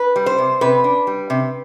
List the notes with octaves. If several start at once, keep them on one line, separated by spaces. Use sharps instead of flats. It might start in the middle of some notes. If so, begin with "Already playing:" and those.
Already playing: B4
G3
C5
C3
C3 B4
D4
G3
C3